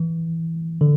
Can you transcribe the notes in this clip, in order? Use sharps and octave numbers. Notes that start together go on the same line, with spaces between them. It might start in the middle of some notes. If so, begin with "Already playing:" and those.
Already playing: E3
D3